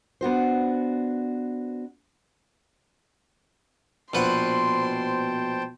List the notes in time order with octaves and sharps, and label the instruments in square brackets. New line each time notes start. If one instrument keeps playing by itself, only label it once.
[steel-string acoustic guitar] B3 D4 F#4 C5
[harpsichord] A#1 B4 F#5 [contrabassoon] B2 [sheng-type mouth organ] C5 G5 A5 [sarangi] C6